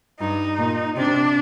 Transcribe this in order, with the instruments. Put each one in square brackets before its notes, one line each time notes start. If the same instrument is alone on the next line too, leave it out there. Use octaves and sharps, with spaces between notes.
[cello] G2 [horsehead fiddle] D#4
[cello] A#2
[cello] C3 [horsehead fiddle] D4